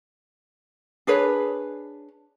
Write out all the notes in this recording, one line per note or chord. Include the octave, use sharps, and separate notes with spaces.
D4 G#4 B4 C#5